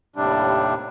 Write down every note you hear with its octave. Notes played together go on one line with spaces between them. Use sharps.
D#2 A2 C3 G3 D4